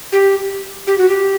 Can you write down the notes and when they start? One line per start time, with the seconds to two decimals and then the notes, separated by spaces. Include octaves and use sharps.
0.12 G4
0.87 G4
0.98 F#4
1.09 G4